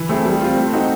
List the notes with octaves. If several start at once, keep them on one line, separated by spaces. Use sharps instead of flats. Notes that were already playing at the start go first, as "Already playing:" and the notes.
Already playing: E3
A3 C4 E4 G#4
G3
C4 F4
A3
C4 D#4 F#4